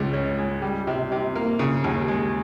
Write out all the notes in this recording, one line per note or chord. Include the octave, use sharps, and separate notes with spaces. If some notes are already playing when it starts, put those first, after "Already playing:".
Already playing: C#2 C#3
C#4
G#3
G3
C3
C3
A#3
C#3
D#2
G#3